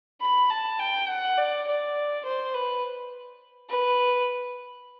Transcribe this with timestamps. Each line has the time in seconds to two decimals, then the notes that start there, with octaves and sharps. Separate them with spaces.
0.21 B5
0.50 A5
0.79 G5
1.09 F#5
1.38 D5
1.67 D5
2.25 C5
2.54 B4
3.69 B4